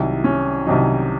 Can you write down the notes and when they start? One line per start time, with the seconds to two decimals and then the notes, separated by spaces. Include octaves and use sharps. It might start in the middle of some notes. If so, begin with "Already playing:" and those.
Already playing: C2 C3 D#3 F#3 E4
0.24 C#4
0.67 C2 C3 D#3 F#3 D#4